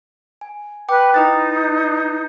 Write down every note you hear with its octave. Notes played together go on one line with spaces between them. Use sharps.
G#5
B4 G5 D6
D#4 E4 B4 A6